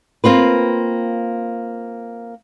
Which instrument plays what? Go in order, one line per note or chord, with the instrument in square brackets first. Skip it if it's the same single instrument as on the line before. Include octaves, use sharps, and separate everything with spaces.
[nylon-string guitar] A#3 C4 F4 B4